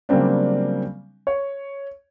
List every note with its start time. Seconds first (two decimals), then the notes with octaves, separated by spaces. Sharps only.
0.09 C#3 F#3 G3 A#3 C4 D4
1.27 C#5